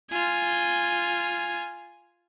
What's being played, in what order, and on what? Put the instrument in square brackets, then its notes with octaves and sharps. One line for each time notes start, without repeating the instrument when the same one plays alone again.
[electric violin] F4 G#5